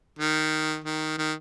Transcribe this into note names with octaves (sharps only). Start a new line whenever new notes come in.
D#3
D#3
D#3